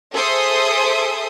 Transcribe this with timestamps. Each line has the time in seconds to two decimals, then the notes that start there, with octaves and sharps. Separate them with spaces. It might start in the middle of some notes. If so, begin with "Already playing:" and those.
0.14 G#4 A4 C5 E5 C6 D#6